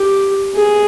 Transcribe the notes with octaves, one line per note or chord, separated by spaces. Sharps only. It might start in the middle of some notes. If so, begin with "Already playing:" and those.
Already playing: G4
G#4